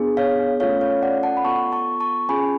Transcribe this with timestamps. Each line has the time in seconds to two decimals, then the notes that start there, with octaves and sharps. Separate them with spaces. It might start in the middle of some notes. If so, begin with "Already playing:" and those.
Already playing: B3 D4 G#4
0.17 C#5 F5
0.60 A3 C#4 F4 A4 C#5 F5
0.81 C#5 F5
1.03 D5 F#5
1.23 F#5 A5
1.37 B5
1.44 B3 F4 A4 A5 C#6
1.72 A5 C#6
2.00 A5 C#6
2.29 C#4 F4 G#4 G#5 B5